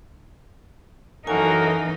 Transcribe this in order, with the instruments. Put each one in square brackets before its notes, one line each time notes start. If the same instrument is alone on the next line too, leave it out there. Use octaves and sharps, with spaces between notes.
[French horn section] F#2 A4 [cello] E3 D#4 [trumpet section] A#3 F#4 A#4 [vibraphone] G#5